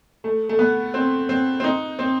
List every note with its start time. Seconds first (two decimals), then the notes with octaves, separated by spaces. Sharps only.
0.24 A3
0.49 A3
0.59 B3
0.94 C4
1.29 C4
1.60 C4
1.64 D#4
1.99 C4